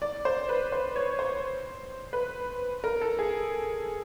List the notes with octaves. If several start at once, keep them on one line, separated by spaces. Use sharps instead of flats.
D5
C5
B4
C5
C#5
C5
B4
A#4
A4
G#4